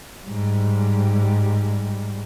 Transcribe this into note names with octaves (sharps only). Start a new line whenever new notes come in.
G#2 G3